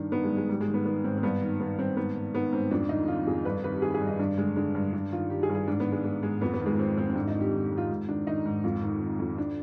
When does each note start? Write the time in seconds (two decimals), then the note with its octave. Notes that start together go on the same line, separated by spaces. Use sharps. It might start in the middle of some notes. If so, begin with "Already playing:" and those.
Already playing: G2 D#3 D4
0.12 D#3 B3
0.24 G#3
0.30 G2
0.37 G#3
0.49 G#2 G3
0.61 G#3
0.68 D#3
0.74 B3
0.85 D#3 B3
1.04 G#2 C4
1.17 C4
1.23 G2 B3
1.42 D#3
1.60 D#3 B3
1.79 G2 C4
1.97 G#2 B3
2.16 D#3
2.35 D#3 B3
2.53 G#2 C4
2.71 F2 D4
2.89 D#3 D#4
3.08 D#3 F4
3.27 F2 G#4
3.45 G2 B4
3.64 D#3 B4
3.74 G4
3.82 D#3 G#4
3.94 G#4
4.01 G2
4.07 D#4
4.19 G2 D4
4.38 D3 G#3
4.56 D3 G#3
4.74 G2
4.93 G2 D4
5.12 D#3 F4
5.30 D#3 G4
5.43 G#4
5.49 G2
5.54 G#4
5.68 G#2 D4
5.80 B3
5.86 D#3
5.92 G#3
6.04 D#3 G#3
6.23 G#2 G#3
6.41 F2 B3
6.54 B3
6.60 D#3
6.66 G#3
6.78 D#3 C4
6.97 F2 C4
7.10 C4
7.15 G#2 D4
7.28 D#4
7.34 D#3
7.40 G4
7.53 D#3
7.65 G4
7.72 G#2
7.77 F4
7.89 G#2
8.09 D#3 D4
8.27 D#3 D#4
8.45 G#2
8.64 F2 F4
8.82 D#3
9.01 D#3
9.19 F2
9.38 D4